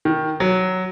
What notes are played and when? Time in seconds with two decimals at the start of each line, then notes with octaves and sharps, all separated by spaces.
0.05 D#3
0.40 F#3